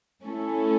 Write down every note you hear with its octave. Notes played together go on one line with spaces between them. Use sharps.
A3 C#4 E4 A4